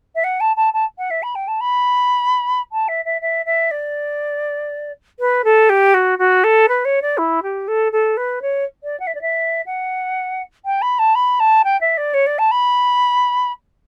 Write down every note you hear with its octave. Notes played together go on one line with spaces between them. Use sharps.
E5
F#5
A5
A5
A5
F#5
E5
B5
G5
A5
B5
A5
E5
E5
E5
E5
D5
B4
A4
G4
F#4
F#4
A4
B4
C#5
D5
E4
G4
A4
A4
B4
C#5
D5
F#5
E5
D5
E5
F#5
G5
B5
A5
B5
A5
G5
E5
D5
C#5
D5
A5
B5